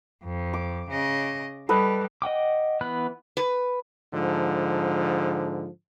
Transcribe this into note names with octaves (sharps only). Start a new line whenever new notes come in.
F2
D6
C#3 D#5
G3 A4 B4 D#5
D#5 F#5 G5 D6
E3 B3 B5 F#6
B4
G#2 D3 F3